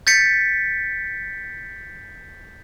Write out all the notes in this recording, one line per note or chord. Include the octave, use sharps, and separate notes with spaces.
G6 A6 B6 C#7